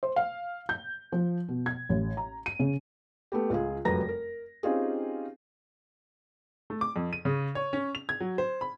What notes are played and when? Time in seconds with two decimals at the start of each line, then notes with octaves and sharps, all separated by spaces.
0.03 C5
0.16 F5
0.69 G6
1.12 F3
1.48 B2
1.66 G#6
1.89 A1
2.17 A#5
2.46 D#7
2.59 C#3
3.32 A3 B3 G4
3.50 C#2 F4 G#4
3.85 F1 F#2 G3 B4 A#5 A#6
4.09 A#4
4.63 C4 C#4 D#4 F4 G4 G#4
6.70 A3
6.81 D6
6.96 F2
7.13 D#7
7.25 C#3
7.55 C#5
7.73 C#4
7.95 F7
8.09 G#6
8.21 F#3
8.38 C5
8.61 B5